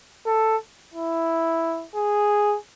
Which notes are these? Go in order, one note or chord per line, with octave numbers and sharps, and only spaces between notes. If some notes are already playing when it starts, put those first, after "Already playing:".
A4
E4
G#4